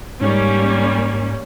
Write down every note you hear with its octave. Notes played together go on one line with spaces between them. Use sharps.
G#2 G3 A#3 C#4